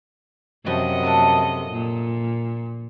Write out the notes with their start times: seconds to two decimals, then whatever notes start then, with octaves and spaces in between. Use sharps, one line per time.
0.66 F#2 C3 F3 G3 F#4 D#5
1.03 A#3 D4 A4
1.71 A#2